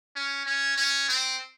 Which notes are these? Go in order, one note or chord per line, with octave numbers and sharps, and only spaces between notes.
C#4
C#4
C#4
C4